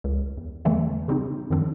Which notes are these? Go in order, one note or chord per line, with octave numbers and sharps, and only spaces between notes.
C#2
E2
E2 D3 E3 G3 A3 A#3
C#3 G3 C4 D#4
F#2 D#3 F3 C4 D4